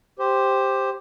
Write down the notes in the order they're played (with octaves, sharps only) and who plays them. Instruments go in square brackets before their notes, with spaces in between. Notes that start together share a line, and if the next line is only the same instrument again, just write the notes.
[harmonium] G4 C5